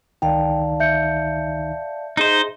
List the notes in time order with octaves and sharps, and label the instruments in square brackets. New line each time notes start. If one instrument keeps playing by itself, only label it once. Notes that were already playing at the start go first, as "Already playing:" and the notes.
[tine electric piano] C#2 D#3 D#4 [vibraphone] D5 F5 A5 [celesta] G5
[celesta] E5 G6 C#7
[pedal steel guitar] D#4 C5 [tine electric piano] G#4 D#5